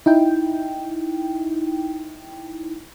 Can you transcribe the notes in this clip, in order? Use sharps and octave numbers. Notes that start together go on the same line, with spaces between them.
D#4 E4 G5